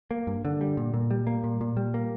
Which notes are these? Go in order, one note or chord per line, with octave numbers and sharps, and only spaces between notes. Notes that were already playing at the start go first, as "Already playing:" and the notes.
A#3
G2
D3
G3
A#2
A#2
G3
A#3
A#2
A#2
G3
A#3